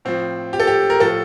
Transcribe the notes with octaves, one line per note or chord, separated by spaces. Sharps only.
A2 F3 C4
G4
A4
G4
A#4
A2 F3 A4